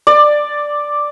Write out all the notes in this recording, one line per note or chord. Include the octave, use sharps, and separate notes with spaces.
D5